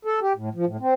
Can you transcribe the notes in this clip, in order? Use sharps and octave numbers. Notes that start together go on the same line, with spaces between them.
A4
G4
A2
F3
A2
C4